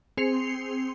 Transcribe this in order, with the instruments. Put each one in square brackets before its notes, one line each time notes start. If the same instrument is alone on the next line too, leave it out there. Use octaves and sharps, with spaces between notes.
[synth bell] C4 G#4 C6 C7 C#7 F7